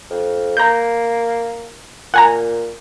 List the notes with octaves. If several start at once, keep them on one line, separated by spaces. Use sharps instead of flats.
F2
A#3 A#5 G6
A#2 F#5 G#5 A#5